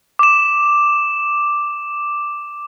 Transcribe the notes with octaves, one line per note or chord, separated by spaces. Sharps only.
D6 E7